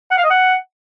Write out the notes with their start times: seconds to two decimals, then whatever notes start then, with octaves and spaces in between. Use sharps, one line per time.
0.11 F#5
0.17 F5
0.24 D#5
0.30 F#5